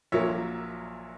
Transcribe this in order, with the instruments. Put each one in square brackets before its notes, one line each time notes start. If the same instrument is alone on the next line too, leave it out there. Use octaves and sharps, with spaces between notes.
[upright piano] A#1 A#2 F#3 A#3 C#5 E5